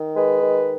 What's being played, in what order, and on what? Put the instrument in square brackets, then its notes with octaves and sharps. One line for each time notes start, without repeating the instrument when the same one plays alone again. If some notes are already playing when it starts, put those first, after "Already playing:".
Already playing: [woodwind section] D#3
G#3 B4
D#3